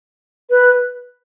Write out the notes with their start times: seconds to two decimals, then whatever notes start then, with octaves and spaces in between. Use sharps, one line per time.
0.50 B4